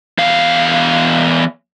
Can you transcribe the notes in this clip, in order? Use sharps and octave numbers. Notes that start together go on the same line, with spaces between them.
E2 F5